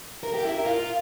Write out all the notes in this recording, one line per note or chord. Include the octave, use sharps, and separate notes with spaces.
A#4
G4
E4
A#4
F4